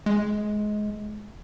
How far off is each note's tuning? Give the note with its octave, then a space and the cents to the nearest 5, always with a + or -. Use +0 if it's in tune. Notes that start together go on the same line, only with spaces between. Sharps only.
G#3 +20